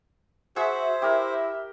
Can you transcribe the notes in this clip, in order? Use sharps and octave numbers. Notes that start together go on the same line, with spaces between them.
F#4 G#4 C5 E5
E4 G4 A#4